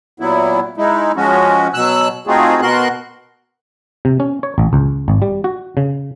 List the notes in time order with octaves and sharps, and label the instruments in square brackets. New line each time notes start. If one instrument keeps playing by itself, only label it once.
[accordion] A#2 F#3 B3 E4
G#3 D#4 E4
F3 G#3 C#4 F#4
B2 F#3 E6 F#6
A3 C4 D#4 F4 F#4 G#4
B2 B3 F#4 A#4 C6 F#6
[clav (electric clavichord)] C3
C#4
C#5
A1
C#2
G#1
G3
F#4
C#3